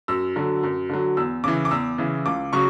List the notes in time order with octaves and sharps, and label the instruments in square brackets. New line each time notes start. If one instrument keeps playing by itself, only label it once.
[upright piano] F#2 E6
D3 F#3
F#2
D3 F#3
E2 E6
C#3 E3 D6
D6
E2 E6
C#3 E3
C#2 D6
C#3 F#3 C#6